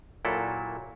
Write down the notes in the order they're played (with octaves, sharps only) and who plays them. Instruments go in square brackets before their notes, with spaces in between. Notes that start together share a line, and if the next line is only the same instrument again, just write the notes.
[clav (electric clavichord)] A#2 F#3 E4 A4